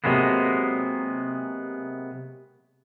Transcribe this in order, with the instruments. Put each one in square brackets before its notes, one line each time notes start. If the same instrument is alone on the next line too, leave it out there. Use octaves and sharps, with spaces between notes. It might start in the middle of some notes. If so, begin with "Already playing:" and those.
[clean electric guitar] C3 F#3 G#3 A#3 B3